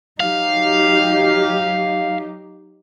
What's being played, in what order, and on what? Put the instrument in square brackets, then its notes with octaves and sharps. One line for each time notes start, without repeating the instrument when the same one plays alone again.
[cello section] F#3 D#4 G4 [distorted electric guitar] F5